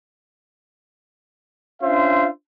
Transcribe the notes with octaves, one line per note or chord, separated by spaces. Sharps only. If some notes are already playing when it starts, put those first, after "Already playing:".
C#4 D4 F4 C5 E5